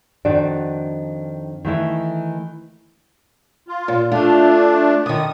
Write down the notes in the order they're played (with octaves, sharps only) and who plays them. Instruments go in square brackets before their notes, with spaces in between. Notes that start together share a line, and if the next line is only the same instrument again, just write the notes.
[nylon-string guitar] F2 D#3 D4 F#4 D5
D#3 E3 A3 E4
[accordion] F4
[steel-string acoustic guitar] A#2
[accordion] A3 D4 [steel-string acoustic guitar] F4
[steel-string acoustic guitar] D3 D#3 [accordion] D#6